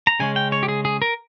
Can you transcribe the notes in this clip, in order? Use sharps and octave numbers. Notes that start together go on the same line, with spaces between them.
A#5
C#3 G#3 C#4 G#5
G5
C#5
G4
G#4
G#4
A#4